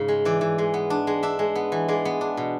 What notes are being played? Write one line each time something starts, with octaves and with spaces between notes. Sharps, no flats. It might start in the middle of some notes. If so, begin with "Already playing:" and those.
Already playing: G#2 C#3
G#3
E3 D5
E3
G#3
B3
D4
G#3
D4 E5
G#3
B3
E3
G#3 D5
B3
D4
B2